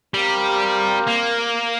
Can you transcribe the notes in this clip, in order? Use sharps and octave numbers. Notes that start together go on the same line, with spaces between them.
G3 C4 G4 A#4 F5
A#3